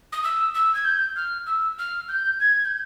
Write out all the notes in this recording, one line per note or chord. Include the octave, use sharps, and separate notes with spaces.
D#6
E6
E6
G#6
G6
F6
E6
F6
G6
G#6
G6